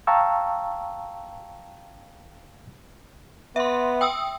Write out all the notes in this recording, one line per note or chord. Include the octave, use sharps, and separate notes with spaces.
F5 G5 A5 A#5 C#6 E6
B3 E5 C6
G5 D#6 E6